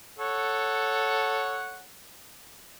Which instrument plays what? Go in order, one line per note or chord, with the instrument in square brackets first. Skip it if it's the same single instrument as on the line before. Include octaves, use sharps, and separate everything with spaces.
[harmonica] A4 C#5 F#5